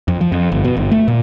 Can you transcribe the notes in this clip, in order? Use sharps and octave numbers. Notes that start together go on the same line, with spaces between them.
F2
F3
F2
G1
B2
G1
A3
A#2